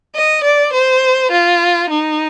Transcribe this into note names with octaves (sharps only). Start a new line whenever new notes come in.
D#5
D5
C5
F4
D#4